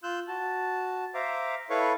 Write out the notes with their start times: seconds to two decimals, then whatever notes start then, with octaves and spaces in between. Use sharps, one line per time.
0.03 F4 E6 F#6 G6
0.28 F#4 A5
1.14 C5 E5 F5 A#5 D6
1.70 E4 A4 B4 C#5 F5 C#6